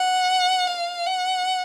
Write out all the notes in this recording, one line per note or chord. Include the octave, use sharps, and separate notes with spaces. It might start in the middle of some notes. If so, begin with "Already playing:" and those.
Already playing: F#5
F5
F#5